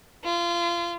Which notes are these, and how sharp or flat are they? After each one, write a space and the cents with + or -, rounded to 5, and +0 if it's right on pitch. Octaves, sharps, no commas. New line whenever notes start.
F4 -25